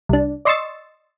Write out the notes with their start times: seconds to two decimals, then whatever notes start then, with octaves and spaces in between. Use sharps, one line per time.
0.09 C2 D4
0.45 D5 D#5 C6 C#6 E6 A6